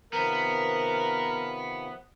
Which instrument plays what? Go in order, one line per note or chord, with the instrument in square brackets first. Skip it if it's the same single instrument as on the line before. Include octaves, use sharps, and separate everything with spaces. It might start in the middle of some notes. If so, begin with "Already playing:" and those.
[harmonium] C3 D#3 F3 [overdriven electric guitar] B3 [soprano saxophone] A#4